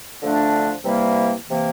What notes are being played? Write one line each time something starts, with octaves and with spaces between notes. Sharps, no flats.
D3 F3 A3 D4
C3 E3 G3 A#3
C3 E3 A#3